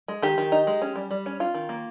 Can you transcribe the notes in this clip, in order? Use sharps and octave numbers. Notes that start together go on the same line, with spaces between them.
G#3
D#3 G4
D#3
D#4
G#3
C#4
G3
G3
C#4
C#4 F4
D#3
A#3